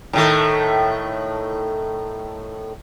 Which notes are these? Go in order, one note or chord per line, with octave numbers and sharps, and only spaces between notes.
A2 D#3 A3